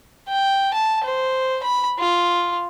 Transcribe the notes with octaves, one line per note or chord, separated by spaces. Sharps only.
G5
A5
C5
B5
F4